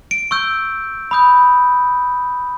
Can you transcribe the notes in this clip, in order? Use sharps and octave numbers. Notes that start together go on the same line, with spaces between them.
D7
C#6 E6 G6
B5 D#6 G6